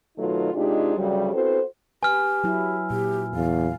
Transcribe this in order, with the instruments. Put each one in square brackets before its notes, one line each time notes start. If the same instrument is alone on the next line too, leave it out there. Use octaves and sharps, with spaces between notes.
[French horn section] B2 D#3 F#3 A3 D#4 F4
C3 G#3 D4 D#4 F4 G4
D2 C#3 F#3 G3
B3 C4 E4 F#4 A4 C5
[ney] G4 [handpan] B4 [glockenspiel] G#5 F6
[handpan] F#3 E4
[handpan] A#2 [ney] G4
[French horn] E2 [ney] F5